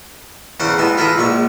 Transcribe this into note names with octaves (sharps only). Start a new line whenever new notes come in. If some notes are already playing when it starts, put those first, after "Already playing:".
E2 C#3 C5 F#5
A1 E3 G#3 B3 A5
B3 E4 F4 G#4 A4 A#5
A#1 F3 G#3 C#6